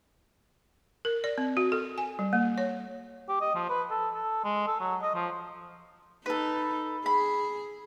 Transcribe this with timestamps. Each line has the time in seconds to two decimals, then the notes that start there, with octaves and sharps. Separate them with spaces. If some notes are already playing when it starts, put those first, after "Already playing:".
1.05 A#4
1.24 D5
1.38 C4
1.57 F#4
1.72 A4
1.98 G#5
2.19 G3
2.33 A#3
2.58 C#5
3.29 G4
3.41 D#5
3.55 F3
3.70 B4
3.91 A4
4.15 A4
4.44 G#3
4.67 A4
4.80 F#3
5.02 D#5
5.15 F3
6.26 D#4 A4 B4
7.06 G#4 B5